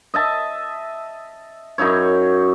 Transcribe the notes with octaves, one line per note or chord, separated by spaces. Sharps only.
D#5 E5 A5
F#2 D#4 E4 C#5